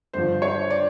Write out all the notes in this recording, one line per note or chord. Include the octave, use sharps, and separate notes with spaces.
G2 D3 F3 C5
C#5
D5